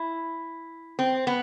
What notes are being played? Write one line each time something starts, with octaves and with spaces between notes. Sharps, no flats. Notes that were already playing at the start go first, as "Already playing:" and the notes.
Already playing: E4
C4
B3